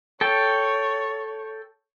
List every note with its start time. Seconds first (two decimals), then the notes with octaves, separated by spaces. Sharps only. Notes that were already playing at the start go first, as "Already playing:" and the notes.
0.21 A4 C#5 G5